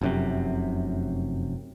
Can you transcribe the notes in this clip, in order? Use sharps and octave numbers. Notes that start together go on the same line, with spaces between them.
F1 F#2 C3